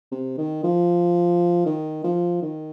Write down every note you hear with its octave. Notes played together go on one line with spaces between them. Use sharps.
C3
D#3
F3
D#3
F3
D#3